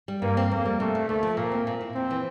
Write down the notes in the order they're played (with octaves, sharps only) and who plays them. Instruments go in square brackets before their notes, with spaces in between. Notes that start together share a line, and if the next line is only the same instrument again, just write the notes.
[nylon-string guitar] G3
[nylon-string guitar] G2 [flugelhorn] A#3
[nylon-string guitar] C4
[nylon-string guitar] F2 [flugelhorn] A#3
[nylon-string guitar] G3
[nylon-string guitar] C3 [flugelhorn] A3
[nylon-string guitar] A#3
[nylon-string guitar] D2 [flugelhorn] A3
[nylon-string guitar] F3
[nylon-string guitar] A#2 [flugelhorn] A#3
[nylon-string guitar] C4
A#2
E4
[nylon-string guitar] F2 [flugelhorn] C4
[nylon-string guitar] E3